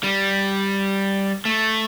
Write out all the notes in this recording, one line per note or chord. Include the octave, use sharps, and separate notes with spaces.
G3
A3